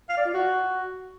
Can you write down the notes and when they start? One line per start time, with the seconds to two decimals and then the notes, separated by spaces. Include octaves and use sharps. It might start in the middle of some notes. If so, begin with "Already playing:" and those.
0.09 F5
0.17 D5
0.26 F4
0.34 F#4